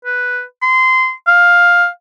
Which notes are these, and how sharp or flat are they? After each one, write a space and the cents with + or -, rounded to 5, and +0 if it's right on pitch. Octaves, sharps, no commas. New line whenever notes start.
B4 +0
C6 -20
F5 +10